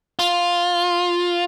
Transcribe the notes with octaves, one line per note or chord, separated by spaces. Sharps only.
F4